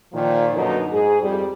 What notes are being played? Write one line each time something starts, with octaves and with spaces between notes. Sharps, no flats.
A#2 D#3 F3
F#2 B2 D3 F#3 A#3 D#4
G#2 G#4
F2 G3